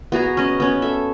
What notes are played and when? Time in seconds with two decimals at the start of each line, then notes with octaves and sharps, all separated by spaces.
0.12 B3 F#4 G#4 A#5
0.37 C#4 D#5
0.60 B3 C#4
0.82 A4 E5